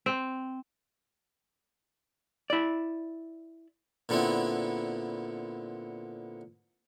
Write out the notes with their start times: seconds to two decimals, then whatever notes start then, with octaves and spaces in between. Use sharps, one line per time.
0.06 C4
2.50 E4 D5
4.09 A#2 D3 B3 C4 E4